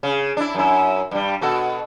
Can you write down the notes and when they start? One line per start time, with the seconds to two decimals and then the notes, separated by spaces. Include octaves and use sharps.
0.03 C#3
0.37 D4 E4
0.55 F#2 E4
1.11 G2 G3
1.41 B2 F#4 A4